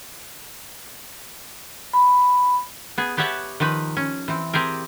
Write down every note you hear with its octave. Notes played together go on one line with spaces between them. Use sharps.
B5
B3 G#4
B3 G4 C#5 E5 F#5 A5
D#3 F3 D#4 B4
C#4
E3 C4
C4 G4 G#4 A#4